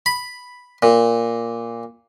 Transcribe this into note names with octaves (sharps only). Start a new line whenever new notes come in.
B5
A#2